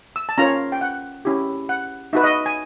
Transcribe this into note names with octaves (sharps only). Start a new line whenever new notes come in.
E6
A5
C#4 F4 A#4 C#5 A#5
G5
F#5
C#4 E4 G4
F#5
D#4 F#4 B4 E5
D#5
G#5